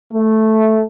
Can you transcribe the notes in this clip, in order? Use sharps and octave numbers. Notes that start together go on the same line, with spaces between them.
A3